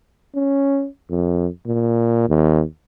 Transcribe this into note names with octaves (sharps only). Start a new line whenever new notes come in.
C#4
F2
A#2
D#2